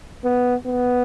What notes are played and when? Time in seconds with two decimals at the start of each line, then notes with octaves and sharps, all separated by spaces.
0.24 B3
0.67 B3